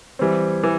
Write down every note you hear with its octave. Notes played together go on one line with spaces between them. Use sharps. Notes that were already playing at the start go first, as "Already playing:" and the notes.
E3 G3 C4
E3